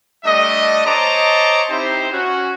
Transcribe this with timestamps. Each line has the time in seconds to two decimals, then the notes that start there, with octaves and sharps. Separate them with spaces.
0.25 G3 A3 D4 D#5
0.86 C5 C#5 D#5 A5 A#5 D6
1.69 C4 D#4 E4 G4 C5
2.11 C#4 F#4